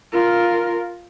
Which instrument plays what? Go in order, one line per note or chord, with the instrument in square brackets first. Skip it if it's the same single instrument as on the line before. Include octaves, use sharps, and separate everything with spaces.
[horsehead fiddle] F4 A#4